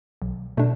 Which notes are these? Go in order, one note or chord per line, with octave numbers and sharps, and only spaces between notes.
B1
B2 A3 D4